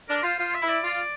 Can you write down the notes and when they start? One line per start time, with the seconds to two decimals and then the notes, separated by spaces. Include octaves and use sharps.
0.08 D4 A#4
0.23 F4 C5
0.39 F4 C5
0.54 E5
0.62 E4
0.69 D5
0.84 F4